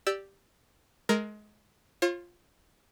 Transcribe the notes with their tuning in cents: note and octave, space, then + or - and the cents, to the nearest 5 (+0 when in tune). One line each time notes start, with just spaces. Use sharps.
G4 +0 D5 +0 E6 +0
G#3 +25 A#4 +0
F4 +0 C#5 -45